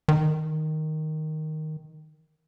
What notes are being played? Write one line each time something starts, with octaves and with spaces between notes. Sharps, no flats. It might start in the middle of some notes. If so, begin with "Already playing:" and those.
D#3